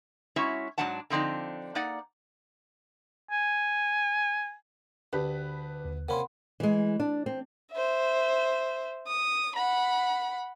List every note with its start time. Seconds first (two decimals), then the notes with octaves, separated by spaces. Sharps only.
0.36 G#3 C#4 E4 F#4 C#5 E5
0.78 G#2 F#3 A3 D4 F#5 A5
1.10 D3 F3 C4 D4 D#4
1.75 A#3 D#4 D5 F#5
3.31 G#5
5.13 D2 D4 G4 B4
5.85 D#2
6.09 C3 A#3 C#4 F#5 B5 C6
6.60 E3 G#3
7.00 D4
7.26 C4
7.72 C5 E5
9.08 D#6
9.56 F#5 B5